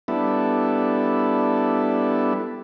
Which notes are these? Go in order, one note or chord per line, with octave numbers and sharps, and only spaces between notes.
G3 B3 D4 E4 A4